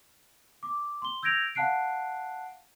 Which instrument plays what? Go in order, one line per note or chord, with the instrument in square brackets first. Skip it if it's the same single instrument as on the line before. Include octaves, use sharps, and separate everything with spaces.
[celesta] D6
C6 G7
E6 G6 G#6 A#6 D7 F7
F5 F#5 A5 F#6 C7 D7